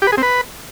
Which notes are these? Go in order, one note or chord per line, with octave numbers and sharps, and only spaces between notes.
G4
B4
G#4
C4
B4